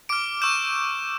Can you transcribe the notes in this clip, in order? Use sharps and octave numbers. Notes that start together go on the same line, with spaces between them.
D6 F6 D7
C#6 E6 G6 E7